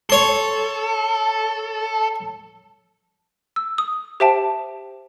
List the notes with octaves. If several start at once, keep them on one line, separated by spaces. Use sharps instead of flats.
A4 C#5 C6
E6
D#6
G4 C5 E5 G5 A5